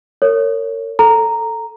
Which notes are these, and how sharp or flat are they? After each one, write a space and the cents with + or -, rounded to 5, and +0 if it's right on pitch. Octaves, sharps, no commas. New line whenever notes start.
A#4 -30 C#5 +0
A4 +5 A#5 -5